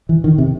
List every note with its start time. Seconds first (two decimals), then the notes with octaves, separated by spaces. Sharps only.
0.09 E3
0.24 D#3
0.38 C3